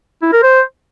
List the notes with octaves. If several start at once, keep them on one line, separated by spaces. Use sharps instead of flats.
E4
A#4
C5